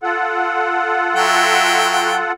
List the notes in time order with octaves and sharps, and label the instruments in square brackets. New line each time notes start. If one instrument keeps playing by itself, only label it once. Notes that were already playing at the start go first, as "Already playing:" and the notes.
[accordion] F4 A4 F#5
[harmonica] F#3 E5 G5